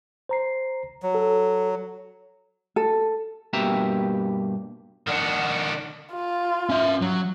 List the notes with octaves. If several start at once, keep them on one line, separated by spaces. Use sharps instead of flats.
C5 A#5 C7
F#3
A4
A4
G2 B2 A#3 G4 E5 A#5
D#3 D4 F#5
F4
C#4 E5
F#3